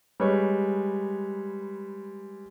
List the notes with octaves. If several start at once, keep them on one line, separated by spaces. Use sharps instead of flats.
G3 G#3 B4 C#5